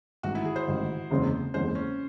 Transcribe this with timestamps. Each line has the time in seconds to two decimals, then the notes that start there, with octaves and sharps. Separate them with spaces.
0.23 A1 G#2 D#3 F#4
0.35 E4
0.45 G#4
0.56 C5
0.67 A1 G#2 D#3
1.11 F#1 E2 C#3 G#3 C4
1.54 F#1 E2 C#3 G#3 C4 C5
1.75 C#4